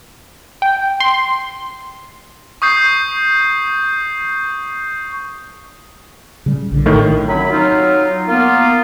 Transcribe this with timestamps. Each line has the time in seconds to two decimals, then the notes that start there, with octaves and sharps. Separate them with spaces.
0.62 G5
1.00 C6
2.62 C#6 D#6 G6 C7
6.46 C#3 G3
6.72 A#1 D3
6.86 A2 D#3
7.28 F#2 F#3 C4 B5
7.50 F#3 D#4 F4
8.28 A#3 B3 F4